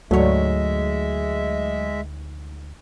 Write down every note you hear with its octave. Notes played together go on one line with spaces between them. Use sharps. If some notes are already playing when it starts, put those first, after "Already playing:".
D2 G#2 F#3 G#3 A3 C#5 E5